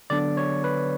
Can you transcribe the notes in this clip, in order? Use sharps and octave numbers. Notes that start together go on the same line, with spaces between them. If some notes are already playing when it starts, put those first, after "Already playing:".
D3 F#3 B3 D4 D5
C#5
B4